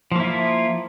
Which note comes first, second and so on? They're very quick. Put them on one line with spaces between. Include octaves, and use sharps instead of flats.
F3 A#3 E4 F4